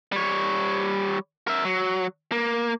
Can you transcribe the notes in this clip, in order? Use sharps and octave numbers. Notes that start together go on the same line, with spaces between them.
G3 C#5
A#4 E5
F#3
A#3